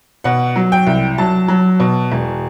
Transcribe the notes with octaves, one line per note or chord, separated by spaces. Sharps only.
B2 F#5
F#3
G5
C2
F#3 A5
F#3
B2
E1